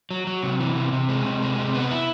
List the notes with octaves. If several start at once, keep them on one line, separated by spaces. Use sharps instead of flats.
F#3
F#3
C3
E3
C3
C3
G#3
C3
G#3
C3
B3
E4